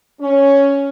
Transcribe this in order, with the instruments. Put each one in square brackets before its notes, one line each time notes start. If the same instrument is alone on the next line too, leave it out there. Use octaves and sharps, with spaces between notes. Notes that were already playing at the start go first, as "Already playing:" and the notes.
[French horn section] C#4